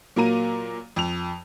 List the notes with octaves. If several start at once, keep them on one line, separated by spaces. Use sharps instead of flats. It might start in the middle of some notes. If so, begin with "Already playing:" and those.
A#2 F#3 A#3 A#5 D#7
F2 F7